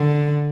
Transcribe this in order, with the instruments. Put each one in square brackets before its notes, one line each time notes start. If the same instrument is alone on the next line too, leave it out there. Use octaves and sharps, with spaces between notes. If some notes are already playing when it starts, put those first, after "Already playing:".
Already playing: [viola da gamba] D3